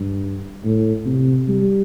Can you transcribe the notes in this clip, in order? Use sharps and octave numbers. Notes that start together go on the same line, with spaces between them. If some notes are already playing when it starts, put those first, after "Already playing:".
Already playing: G2
A2
C3
G3